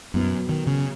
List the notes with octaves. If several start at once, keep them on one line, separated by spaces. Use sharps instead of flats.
F#2 B2 F#3 B3
D#3
C#3